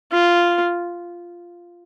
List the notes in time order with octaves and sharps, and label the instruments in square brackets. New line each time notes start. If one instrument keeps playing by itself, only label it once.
[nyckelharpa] F4